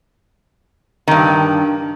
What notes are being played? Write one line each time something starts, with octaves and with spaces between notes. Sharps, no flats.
G2 D#3